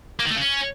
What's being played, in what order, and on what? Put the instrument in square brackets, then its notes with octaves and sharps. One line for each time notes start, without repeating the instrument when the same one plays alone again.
[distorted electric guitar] A#3
D#3
A3
C#3
C#4